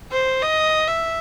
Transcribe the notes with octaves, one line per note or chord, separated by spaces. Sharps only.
C5
D#5
E5